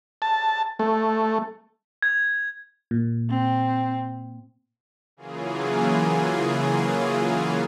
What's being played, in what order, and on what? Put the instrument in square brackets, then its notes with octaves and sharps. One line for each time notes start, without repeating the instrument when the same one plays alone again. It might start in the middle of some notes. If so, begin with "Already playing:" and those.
[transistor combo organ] A5
A3
[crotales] G#6
[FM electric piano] A#2
[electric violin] C4
[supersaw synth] C#3 E3 F#3 A#3 F4 G#4